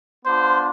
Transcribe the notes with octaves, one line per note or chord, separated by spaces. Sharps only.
B3 D4 F4 C5